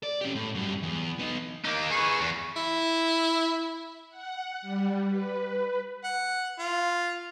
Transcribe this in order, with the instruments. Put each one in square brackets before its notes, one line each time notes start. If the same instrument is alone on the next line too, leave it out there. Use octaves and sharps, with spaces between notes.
[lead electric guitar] D5
C#4 G4
A2
F#2 G3
E2
B3 D#4
[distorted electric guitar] A#3 D#4
[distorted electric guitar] G#4 B4 [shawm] C#6
[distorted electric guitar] E2
[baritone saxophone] E4
[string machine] F#5
G3
B4
[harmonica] F#5
F4